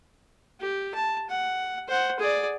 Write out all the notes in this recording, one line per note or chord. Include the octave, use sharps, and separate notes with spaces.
G4
A5
F#5
C5 F#5
G#4 D5